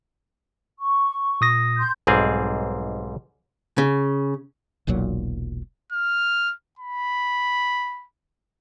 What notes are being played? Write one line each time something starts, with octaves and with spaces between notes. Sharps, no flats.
C#6
A#2 D#6 A#6
C6 G6
B1 G#2 G3 C4 G#4
C#3
E1 B1 A#2 F#3
F6
B5